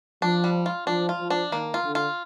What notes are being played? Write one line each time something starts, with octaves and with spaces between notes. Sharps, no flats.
F3 D4
G3
F4
F3 D4
F4
F3
D4
D#3 A#3
F4
D3
F4